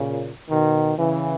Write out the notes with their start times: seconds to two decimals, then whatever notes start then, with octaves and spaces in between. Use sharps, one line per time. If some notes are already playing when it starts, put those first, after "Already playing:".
Already playing: A#2 C#3
0.49 B2 D#3
0.97 C#3 E3